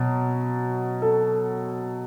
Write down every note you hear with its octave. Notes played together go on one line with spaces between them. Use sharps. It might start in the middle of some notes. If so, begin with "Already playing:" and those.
Already playing: B2 F#3
A4